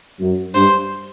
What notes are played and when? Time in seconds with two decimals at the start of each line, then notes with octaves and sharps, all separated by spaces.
0.20 F#2
0.55 G2 C5